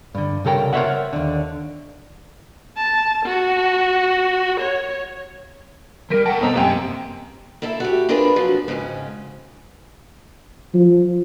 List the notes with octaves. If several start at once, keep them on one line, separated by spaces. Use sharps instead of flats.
G2 D3
C2 C#3 A4 A#4 G5
A#4 C5 C#5 D#5 E5 F#5
D#2 D3
A5
F#4
C#5
E3 G3 A#4 A#6 B6 D7
A4 F#5 G5 A5
B2 C4 A#5
F#2 A#3 C4 G4 G5
A#3 E4 A4 E5
F#4 G4
C4 D4 F4 G#4 A#4 B4
F3 F#3 F#4
F2 G#2 C#3 C#4
F3